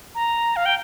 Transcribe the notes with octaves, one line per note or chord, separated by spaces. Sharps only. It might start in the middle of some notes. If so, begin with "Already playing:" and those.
A#5
F5
G5